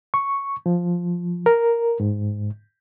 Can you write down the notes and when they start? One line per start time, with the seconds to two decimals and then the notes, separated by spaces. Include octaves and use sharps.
0.14 C#6
0.66 F3
1.46 A#4
2.00 G#2